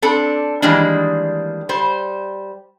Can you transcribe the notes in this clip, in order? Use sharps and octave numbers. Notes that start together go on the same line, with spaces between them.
C4 D4 A4
D#3 E3 G3 G#3 A#3 D4
G3 C5